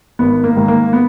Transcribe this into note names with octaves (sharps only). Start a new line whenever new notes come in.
G#1 B3
A#3
G#2 D#3
A#3
B3